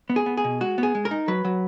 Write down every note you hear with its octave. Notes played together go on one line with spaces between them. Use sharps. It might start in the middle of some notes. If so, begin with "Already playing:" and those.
B3
G#4
B3
G#4
B2
G#3 F#4
B3
G#4
G#3
A#4
D#4
F#3 B4
F#3